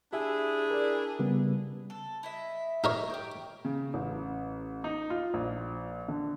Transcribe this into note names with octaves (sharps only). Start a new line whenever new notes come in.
D4 E4 G4 G#4 E5 G#5
A#4 D5
C#3 G3 B3
A4
E4 D#5 E5
D#4 A#4 C#5
G4 G5
C#3
A1
D#4
F4
A#1
D3